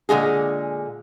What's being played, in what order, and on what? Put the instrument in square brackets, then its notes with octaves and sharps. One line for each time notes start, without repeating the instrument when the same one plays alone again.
[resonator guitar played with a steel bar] A#2 D3 G#3 G#4